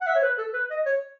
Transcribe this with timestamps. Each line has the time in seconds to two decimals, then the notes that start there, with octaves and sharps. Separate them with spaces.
0.01 F#5
0.06 E5
0.15 C#5
0.22 B4
0.38 A4
0.53 B4
0.70 D#5
0.86 C#5